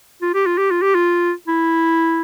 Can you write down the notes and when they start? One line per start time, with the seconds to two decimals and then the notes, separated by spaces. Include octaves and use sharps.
0.22 F4
0.34 G4
0.46 F4
0.58 G4
0.71 F4
0.82 G4
0.95 F4
1.48 E4